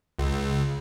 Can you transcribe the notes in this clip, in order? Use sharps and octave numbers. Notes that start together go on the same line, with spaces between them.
C#2